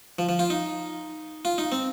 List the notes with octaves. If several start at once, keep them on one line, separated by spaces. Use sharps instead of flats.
F3
F3
F4
D#4
F4
D#4
C4